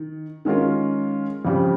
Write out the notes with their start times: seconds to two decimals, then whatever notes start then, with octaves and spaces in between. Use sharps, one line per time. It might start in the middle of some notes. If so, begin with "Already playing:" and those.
Already playing: D#3
0.45 D#3 G#3 C#4 F4 A#4
1.45 F2 C#3 G3